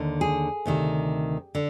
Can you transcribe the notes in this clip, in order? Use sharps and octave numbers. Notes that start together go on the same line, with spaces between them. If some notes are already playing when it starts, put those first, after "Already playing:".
Already playing: D#2 D3
G#4
D2 C3 D#3
D3